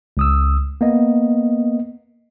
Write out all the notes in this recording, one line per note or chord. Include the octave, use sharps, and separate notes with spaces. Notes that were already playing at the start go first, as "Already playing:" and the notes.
C#2 D#6 E6
A#3 B3 D#5